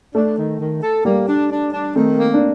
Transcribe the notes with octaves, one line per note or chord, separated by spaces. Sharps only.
A3 D4
D#3
D#3
A4
G3 A#3
D4
D4
D4
D#3 A3 C4
A#3
D4